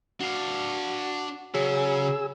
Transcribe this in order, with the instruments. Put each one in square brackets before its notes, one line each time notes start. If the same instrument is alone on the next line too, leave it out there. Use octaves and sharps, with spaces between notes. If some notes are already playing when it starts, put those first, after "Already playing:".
[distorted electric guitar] D4 F5 [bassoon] F#4
[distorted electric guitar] C#3 [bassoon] F#3 [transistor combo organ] G#4 E6